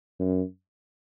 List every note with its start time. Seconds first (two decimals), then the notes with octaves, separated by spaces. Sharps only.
0.19 F#2